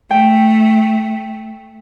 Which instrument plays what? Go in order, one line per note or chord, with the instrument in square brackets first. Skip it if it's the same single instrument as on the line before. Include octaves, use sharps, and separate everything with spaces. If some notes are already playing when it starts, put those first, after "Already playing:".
[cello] A3 [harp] G5